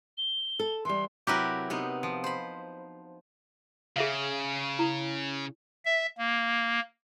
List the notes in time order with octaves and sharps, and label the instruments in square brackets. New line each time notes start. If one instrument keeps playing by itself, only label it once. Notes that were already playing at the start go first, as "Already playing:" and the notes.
[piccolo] G7
[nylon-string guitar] A4
[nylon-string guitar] E3 G3 [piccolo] C6
[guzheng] C3 F#3 E4 [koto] G4 A#4 B4
[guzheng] C3 B3 D#4
[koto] F3
[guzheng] C5 B5
[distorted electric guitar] C#3 [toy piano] G#4 E5 F5
[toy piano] E4
[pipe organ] E5
A#3